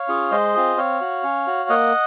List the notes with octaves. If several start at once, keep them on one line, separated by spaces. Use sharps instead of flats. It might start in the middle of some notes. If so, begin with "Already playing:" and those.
Already playing: C#5 F5
C#4 F4 G#4
G#3 C5 D#5
C4 F4 G#4
C4 C#5 F5
F#4
C#4
F#4
A#3 D#5 F#5